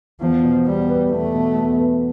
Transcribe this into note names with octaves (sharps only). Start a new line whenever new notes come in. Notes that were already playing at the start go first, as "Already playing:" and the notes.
E2 F3
B2
E2 G3
B3
E2 A3
B2
E2
B3